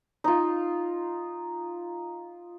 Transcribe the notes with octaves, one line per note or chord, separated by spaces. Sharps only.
D#4 F4